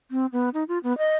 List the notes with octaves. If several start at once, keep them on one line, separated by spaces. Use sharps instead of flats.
C4
B3
D#4
F4
B3
D#5